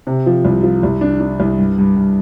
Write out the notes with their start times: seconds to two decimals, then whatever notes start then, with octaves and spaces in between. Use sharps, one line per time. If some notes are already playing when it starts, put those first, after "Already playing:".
0.07 C3
0.26 F3
0.45 C2
0.63 F3
0.83 C2
1.01 D4
1.20 D4
1.40 C2
1.58 G2
1.78 G2
1.96 G2